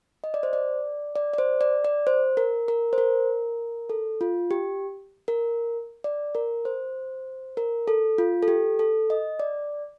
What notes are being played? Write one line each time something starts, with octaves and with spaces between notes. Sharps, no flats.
D#5
D5
C5
D5
D5
D5
C5
D5
D5
C5
A#4
A#4
C5
A#4
A4
F4
G4
A#4
D5
A#4
C5
A#4
A4
F4
A4
G4
A4
D#5
D5